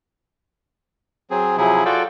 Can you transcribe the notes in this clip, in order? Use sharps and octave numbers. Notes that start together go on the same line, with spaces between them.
F#3 C4 G#4
C3 F3 F#3 E4 G#4
F4 F#4 A4 D5 G5